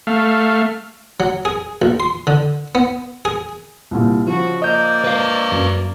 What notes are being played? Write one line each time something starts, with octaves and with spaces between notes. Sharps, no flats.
A3 F5
F#3
G#4
A#1
C6
D3
B3
G#4
C2 A#2
C#3 F3 F#4
A#3 D5 D#5 G6
B4 F5
F#2